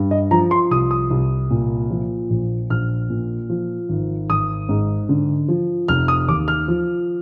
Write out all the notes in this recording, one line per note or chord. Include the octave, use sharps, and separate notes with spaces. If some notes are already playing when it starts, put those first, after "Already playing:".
Already playing: G2
D#5
F3 A#5
C6
C2 D#6
D#6
C2
A#2
F3
A#1
A#1 F6
A#2
F3
G#1
G#1 D#6
G#2
D3
F3
F1 F6
D#6
D#2 D6
F6
F3